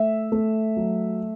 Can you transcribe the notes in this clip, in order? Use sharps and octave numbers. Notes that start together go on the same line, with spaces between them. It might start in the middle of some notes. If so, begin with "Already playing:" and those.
Already playing: A3 E5
A3
F#3